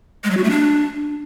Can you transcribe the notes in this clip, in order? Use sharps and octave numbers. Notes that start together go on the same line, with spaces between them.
G#3
F#3
F#4
A3
D4